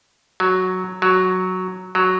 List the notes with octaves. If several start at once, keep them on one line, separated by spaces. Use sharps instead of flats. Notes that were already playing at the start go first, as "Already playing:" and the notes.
F#3
F#3
F#3